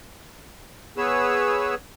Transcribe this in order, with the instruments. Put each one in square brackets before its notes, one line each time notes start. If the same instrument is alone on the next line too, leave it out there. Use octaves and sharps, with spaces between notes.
[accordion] B3 G#4 B4 C#5 E6